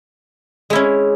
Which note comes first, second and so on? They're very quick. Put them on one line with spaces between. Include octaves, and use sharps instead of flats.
G#3 E4 C#4